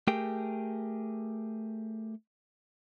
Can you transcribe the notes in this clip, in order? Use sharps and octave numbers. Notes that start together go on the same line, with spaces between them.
A3 G4 G#4 A#4 G5